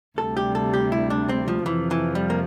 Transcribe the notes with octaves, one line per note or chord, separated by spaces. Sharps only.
D2 C3 G3 A4
G4
A4
G4
E4
D4
C4
F3
F2 C3 E3 F3
E3
G3
A#3